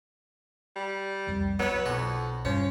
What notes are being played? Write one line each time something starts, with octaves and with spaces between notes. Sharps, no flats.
G3
C2 F2
F#3 B3 E4 C#5
B1 F2 F#4
G2 C#3 F3 C#4